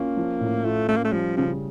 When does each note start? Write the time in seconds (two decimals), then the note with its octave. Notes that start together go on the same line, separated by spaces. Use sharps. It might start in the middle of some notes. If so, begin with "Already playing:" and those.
Already playing: A#3 C#4 F4
0.17 F3
0.40 A2
0.64 A3 F4
0.88 A3 C#4
0.97 A#3
1.05 A3
1.12 F3 G3
1.37 C#3 F3